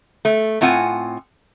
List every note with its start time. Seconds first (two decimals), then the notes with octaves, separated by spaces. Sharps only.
0.25 A3
0.61 A2 C4 F4 F#5 G#5